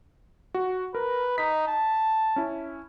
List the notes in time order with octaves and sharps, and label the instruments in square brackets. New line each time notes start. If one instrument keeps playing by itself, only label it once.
[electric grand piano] F#4
[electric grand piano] A#4 [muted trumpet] B4
[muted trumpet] D#4 [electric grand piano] B6
[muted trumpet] A5
[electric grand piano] C#4 E4